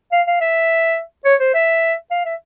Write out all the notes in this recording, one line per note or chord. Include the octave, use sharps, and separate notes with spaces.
F5
F5
E5
C#5
C5
E5
F5
E5